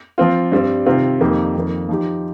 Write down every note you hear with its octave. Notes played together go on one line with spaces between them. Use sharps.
F3 C4 F4
G2 G3 C4
C3 D#3 C4 F4
F2 D#3 A#3 D#4 G4
F2 D#3 A#3
F3 D#4 G4